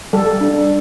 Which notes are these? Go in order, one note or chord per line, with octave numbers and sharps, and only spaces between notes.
G3 A4
D4